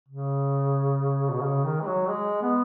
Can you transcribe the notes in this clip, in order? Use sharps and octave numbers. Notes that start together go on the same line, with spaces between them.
C#3
B2
C#3
D#3
G#3
F#3
G#3
B3